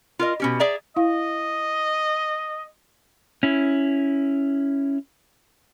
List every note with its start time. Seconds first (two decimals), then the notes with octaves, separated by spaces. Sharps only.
0.19 F4 A#4 D#5
0.40 B2 C#4 G4
0.59 G#4 D5 E5 A#5
0.97 E4 D#5 F5
3.43 C#4 E4